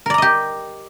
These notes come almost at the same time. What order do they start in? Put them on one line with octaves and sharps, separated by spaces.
A#4 D5 A#5 D#5 G4